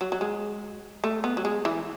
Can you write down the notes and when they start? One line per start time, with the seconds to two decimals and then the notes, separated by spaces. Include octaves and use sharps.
0.01 F#3
0.12 F#3
0.21 G#3
1.04 A3
1.24 B3
1.37 F#3
1.45 G#3
1.65 E3